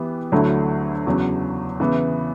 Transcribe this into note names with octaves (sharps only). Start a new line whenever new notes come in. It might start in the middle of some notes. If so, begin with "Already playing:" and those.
Already playing: E3 B3 G4
D2 D3 F#3 A3 E4
E2 C#3 F#3
C#3 E3 B3